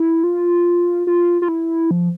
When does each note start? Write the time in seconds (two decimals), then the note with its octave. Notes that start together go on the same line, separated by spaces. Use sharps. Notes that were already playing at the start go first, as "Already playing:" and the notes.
Already playing: E4
0.24 F4
1.07 F4
1.42 F4
1.48 E4
1.91 F3